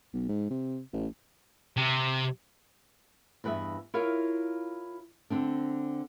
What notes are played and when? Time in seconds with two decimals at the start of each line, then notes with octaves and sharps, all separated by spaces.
0.14 B1
0.29 G#2
0.50 C3
0.93 A1
1.77 C3
3.44 E2 G2 B4 D#5 E5
3.94 E4 F4 A#4 C#5 F5
5.30 D3 C4 D4